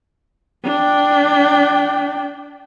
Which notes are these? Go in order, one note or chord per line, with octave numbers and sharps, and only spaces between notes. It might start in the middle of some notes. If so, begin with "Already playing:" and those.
D4 G5